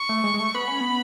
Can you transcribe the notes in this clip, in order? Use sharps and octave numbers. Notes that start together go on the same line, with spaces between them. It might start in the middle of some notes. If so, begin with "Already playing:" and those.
Already playing: C#6
A3
G#3
G#3
A3
B3 B5
C#4
B3